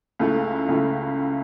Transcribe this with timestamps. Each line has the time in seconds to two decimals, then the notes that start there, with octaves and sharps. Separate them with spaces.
0.19 C#2 C#3 A3 E4
0.68 C#2 C#3 A3 E4